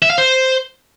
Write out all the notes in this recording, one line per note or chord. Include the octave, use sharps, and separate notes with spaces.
E5
F5
C5